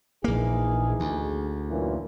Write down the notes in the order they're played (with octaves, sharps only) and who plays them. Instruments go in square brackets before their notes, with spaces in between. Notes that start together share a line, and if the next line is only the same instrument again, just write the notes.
[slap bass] A#1 A#3 [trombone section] E3 D#4 G#4
[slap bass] D2
[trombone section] F#2 A#2 E3